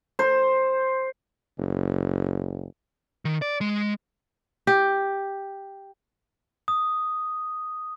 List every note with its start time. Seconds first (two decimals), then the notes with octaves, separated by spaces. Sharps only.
0.19 C5
1.58 F#1
3.25 D#3
3.42 D5
3.61 G#3
4.67 G4
6.68 D#6